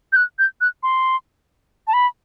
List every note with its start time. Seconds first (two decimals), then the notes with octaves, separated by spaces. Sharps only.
0.13 G6
0.16 F#6
0.39 G6
0.61 F#6
0.83 C6
1.87 A5
1.93 B5